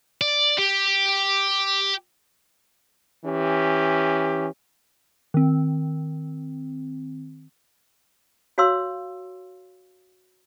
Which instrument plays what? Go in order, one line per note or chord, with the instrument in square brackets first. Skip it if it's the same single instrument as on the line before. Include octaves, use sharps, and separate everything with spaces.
[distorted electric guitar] D5
G4
[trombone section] E3 C#4 G4
[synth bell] D#3 C4
[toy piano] F#4 C#5 F5 C6 E6